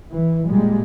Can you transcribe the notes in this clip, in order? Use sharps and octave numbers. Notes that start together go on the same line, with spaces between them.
E3
A#2 G3 G#3